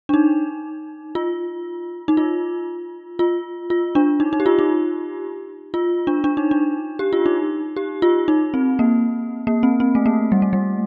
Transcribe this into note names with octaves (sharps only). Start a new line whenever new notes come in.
D4
D#4
F4
D#4
F4
F4
F4
D4
D#4
D#4
G4
F4
D#4
F4
D4
D4
D#4
D4
G4
F4
D#4
G4
F4
D#4
C4
A#3
A#3
C4
C4
A3
A#3
G3
A3
G3